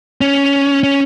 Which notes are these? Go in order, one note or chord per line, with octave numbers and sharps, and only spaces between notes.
C#4
C#4